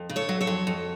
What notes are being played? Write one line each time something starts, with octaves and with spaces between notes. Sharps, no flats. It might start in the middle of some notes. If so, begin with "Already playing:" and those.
Already playing: F2
C#3
A4 C#5
F#3
A4 C#5
F2
F2